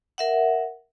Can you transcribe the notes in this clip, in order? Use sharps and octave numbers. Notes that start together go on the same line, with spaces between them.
A#4 E5 F#5